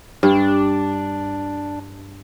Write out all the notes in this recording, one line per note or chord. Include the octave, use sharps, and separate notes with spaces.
G2 D4